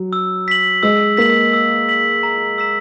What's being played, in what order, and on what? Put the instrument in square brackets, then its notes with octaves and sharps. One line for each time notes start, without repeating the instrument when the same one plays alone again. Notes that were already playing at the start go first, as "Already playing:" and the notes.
Already playing: [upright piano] F#3
[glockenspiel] E6
B6 F#7
[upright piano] G#3 [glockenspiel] E6
[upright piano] A#3 [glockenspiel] B6 F#7
[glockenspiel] E6
B6 F#7
A#5
E6 B6 E7